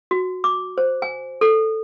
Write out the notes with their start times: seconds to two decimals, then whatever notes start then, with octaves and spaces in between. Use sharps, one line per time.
0.11 F#4
0.44 D6
0.78 C5
1.02 G#5
1.41 A4